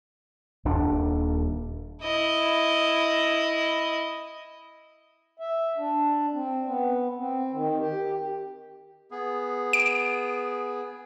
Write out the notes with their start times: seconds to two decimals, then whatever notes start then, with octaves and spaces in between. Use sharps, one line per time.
0.65 D#1 D#2 D4
2.02 E4 D#5
5.40 E5
5.78 D4
6.33 C4
6.67 B3
7.17 C4
7.52 D#3
7.79 G4
9.11 B3 G#4
9.73 D7